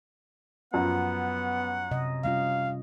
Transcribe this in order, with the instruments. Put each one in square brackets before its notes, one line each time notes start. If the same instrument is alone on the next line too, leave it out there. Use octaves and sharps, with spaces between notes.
[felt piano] F#2 F3 [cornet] B3 [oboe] F#5
[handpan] C3 D#5
[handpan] G3 C#4 F4 [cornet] F5